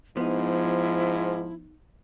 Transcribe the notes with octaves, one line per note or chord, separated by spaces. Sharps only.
G#2 F3 B3 D#4 E4